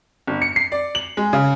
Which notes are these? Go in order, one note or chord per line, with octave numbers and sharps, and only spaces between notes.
G1
C#7
C7
D5
F#7
G#3
C#3